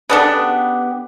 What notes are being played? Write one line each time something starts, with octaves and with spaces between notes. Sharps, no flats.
C#3 B3 D4 G4 A4